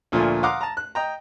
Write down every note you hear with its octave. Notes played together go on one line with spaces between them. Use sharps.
D2 A#2 F3 A3 F4 G#5
F5 F#5 A#5 C6 D6 D#6
A5 A#5
F#6
D#5 G5 A#5